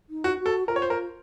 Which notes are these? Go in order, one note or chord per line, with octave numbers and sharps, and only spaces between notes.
D#4
F#4
F#4
A4
F4 A#4
C#5
C5
A#4